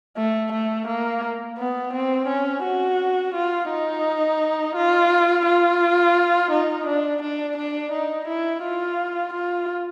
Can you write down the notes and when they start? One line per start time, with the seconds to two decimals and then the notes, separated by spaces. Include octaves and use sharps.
0.17 A3
0.53 A3
0.88 A#3
1.59 B3
1.94 C4
2.28 C#4
2.64 F#4
3.35 F4
3.70 D#4
4.76 F4
5.46 F4
6.52 D#4
6.86 D4
7.23 D4
7.58 D4
7.92 D#4
8.28 E4
8.63 F4
9.34 F4